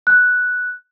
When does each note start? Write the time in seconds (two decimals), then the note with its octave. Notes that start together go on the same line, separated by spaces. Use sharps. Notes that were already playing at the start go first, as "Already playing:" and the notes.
0.07 F#6